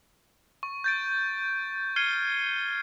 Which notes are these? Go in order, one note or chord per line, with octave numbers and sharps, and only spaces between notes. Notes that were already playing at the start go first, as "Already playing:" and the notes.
C#6
G6 A6 D7
F6 G#6 C7 C#7 D#7 G7